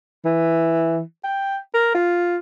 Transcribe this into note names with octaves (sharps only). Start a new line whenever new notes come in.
E3
G5
A#4
F4